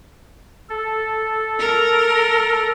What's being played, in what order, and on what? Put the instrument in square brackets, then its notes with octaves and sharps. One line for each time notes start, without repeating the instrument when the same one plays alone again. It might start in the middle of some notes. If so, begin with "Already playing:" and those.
[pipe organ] A4
[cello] A#4